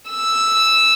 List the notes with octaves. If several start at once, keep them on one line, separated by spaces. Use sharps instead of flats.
E6